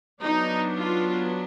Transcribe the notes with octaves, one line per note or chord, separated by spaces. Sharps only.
F#3 B3 D4 D#4
F4